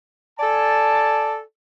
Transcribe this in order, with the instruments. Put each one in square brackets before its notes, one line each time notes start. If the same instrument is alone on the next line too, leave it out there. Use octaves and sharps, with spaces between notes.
[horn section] A4 D5 G#5 A5